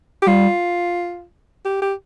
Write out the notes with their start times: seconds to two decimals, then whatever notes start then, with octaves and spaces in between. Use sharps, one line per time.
0.22 G4
0.26 G3 F4
1.65 G4
1.82 G4